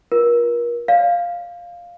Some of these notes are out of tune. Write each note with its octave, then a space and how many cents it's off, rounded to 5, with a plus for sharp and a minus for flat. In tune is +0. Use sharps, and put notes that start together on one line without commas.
F4 +0 A#4 +35
D5 -25 F5 +0